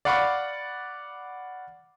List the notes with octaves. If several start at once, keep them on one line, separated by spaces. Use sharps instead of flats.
D5 F5 F#5 B5 C#6 D6